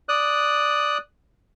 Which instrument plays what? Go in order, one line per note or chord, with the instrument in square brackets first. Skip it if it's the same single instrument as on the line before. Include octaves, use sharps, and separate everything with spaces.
[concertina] D5 D#6 F#6